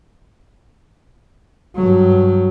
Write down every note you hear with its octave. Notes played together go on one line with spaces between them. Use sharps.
G2 F#3